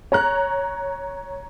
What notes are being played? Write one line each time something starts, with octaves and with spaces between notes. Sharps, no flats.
C#5 A#5 F#6